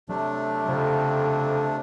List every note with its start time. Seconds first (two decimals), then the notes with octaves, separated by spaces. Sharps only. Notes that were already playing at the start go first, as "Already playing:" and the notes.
0.09 C3 F#3 A3 D4
0.69 F2 C#3